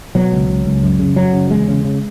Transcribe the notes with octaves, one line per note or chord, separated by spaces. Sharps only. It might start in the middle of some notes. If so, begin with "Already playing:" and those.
B2 F#3
C#2
C#2
C#2
F#2
C#3
F#2 F#3
C#3
E2 G#3
C#3
C#3